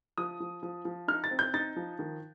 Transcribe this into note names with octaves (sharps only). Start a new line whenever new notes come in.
F3 D#6
F3
F3
F3
D#4 F6
A6
C4
G6
D#4 A6
F3
D#3